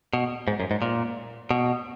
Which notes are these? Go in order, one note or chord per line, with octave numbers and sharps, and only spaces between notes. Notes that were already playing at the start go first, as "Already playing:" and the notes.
B2
G#2
F#2
G#2
A#2
B2